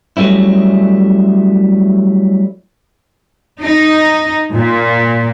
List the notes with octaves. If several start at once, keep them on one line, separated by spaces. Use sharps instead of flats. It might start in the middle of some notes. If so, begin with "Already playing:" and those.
F#3 G3 A3 C#4 E4
D#4
A#2